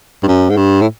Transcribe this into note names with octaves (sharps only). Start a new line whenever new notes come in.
G2
F#2
G#2
G2
A2